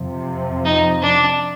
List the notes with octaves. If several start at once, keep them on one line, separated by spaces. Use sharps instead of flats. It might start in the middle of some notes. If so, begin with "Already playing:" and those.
Already playing: F2 C3 F3
D#4
D4